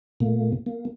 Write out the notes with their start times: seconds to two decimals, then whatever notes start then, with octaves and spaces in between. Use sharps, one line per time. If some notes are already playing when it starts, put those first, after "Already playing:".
0.20 A#2 A3 A#3
0.66 A#3